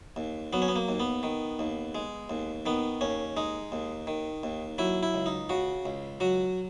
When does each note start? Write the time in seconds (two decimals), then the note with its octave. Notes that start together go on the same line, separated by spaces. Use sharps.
0.16 D#2
0.53 F#3 B3
0.62 C#4
0.68 B3
0.76 A#3
0.88 D#2
1.00 B3
1.23 D#3
1.59 D#2
1.95 G#3
2.30 D#2
2.66 D#3 B3
3.01 D#2 C#4
3.37 G#3 D#4
3.72 D#2
4.07 D#3
4.43 D#2
4.78 F#3 E4
5.03 E4
5.14 C#2
5.26 D#4
5.49 C#3 F#4
5.86 C#2
6.20 F#3 F#4